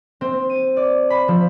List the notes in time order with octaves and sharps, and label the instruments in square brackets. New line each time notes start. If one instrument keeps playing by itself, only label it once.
[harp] C4
D#7
D5
B5
F3